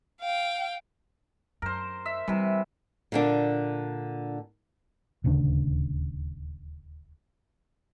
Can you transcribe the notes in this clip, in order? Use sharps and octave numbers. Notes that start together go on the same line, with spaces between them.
F5 G5
F#2 A#4 C5
E5
C3 E3 G3
A#2 D3 D4
D#1 D2 C#3 D4